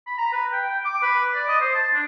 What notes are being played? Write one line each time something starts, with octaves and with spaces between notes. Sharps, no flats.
B5
A#5
B4
G5
G5
D6
B4
D5
D#5
C5
A5
D4